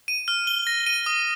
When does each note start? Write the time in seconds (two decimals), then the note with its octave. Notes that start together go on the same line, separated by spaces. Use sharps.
0.08 D#7
0.28 F6
0.47 G7
0.67 A#6
0.87 D#7
1.06 D#6